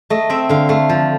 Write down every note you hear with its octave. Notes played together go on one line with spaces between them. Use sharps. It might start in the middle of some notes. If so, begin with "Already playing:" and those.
A3 D#5
C4 E5
D3 F5
A3 F5
F3